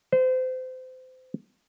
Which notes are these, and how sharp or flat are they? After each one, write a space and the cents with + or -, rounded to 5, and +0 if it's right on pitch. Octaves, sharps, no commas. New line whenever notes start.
C5 -30